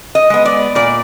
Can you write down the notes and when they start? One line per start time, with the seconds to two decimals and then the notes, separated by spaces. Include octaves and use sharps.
0.15 D#5
0.30 G#3 B3
0.45 D5
0.75 A#2 D5